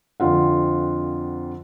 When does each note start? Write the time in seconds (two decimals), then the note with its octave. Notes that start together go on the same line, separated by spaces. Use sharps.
0.20 F2 D3 C4 F4 F#5